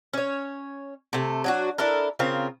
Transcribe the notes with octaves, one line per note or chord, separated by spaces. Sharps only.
C#4 C#5
C3 A3
F#3 D4 F#4
D4 E4 A4 A#4
C#3 C4 F4 A#4